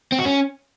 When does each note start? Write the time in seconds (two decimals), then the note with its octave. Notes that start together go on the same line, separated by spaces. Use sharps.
0.12 C4
0.19 F#4
0.25 C#4